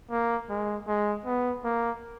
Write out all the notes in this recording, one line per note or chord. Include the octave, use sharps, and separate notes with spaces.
A#3
G#3
G#3
B3
A#3